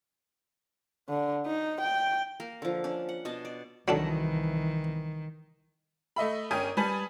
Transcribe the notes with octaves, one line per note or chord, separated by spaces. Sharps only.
D3
D#4
G5
A#3 A#4
D3 F3
C#4 D4
F#5
B2 D4 D#5 A5
D5
C2 D#3 E3 F#3 D4 A4
A3 D#5 E5 B5
G1 C#4 A#4 G5 G#5 D#6
G3 B4 G#5 A5 F#7